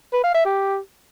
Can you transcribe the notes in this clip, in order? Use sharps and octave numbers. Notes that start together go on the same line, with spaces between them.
B4
F5
E5
G4